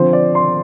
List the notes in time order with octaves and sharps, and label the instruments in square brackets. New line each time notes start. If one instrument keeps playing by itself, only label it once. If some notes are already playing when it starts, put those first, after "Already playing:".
Already playing: [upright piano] D3 F3 C4 C5
D5
C6